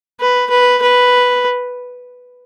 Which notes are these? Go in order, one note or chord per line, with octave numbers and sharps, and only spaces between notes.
B4
B4
B4